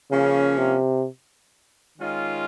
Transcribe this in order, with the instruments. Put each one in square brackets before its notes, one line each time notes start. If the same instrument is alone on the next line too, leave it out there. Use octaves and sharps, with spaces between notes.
[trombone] C#3 [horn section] F3 A#3 C#4
[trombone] C3
[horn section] D#3 G#3 C#4 F4